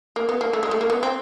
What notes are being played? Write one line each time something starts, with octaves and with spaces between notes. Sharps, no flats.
A#3
B3
A#3
A3
G#3
A3
A#3
B3
C4